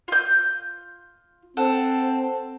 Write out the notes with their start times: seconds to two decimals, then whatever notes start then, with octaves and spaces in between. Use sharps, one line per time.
0.08 F4 G6
1.57 C4 A4 F#5